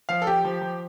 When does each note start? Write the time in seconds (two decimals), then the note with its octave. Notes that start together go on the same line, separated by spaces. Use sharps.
0.09 F3 F5
0.22 A4
0.27 F3 G4
0.45 F3
0.62 F3